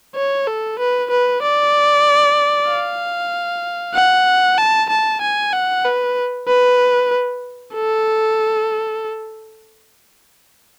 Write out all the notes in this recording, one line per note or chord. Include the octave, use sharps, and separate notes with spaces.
C#5
A4
B4
B4
D5
F5
F#5
A5
A5
G#5
F#5
B4
B4
A4